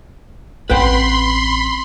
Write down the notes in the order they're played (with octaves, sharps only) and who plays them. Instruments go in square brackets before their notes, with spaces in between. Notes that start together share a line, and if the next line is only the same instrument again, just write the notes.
[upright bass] A1 C4 [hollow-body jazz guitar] B4 F#5 G5 [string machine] B5 C6